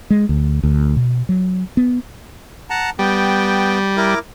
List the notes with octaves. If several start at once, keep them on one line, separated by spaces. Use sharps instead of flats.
G#3
D2
D2
B2
F#3
B3
F#5 A5 A#5
G3 B3 G5
E4 A#4 D6